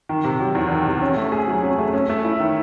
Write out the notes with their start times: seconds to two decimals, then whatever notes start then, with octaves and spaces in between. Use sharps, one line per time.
0.09 D#3
0.24 C3
0.40 F#3
0.55 E2
0.70 D#3
0.86 C3
1.01 C#4
1.17 A3
1.32 G#4
1.47 F#3
1.63 C#4
1.79 A3
1.93 C#4
2.09 A3
2.24 E4
2.40 D#3